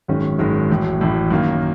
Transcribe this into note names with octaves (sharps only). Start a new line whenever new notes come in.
G#1 F#2 D#3 G#3 C#4
G#1 F#2 D#3 G#3 C#4
A1 A2 F#3
A1 A2 F#3
F#2 D#3 F#3 A#3